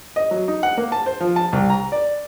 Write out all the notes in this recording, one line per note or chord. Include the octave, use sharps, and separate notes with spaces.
D#5
F#3
D#4
F#5
A#3
A5
C5
F3
A5
C2
A#5
D5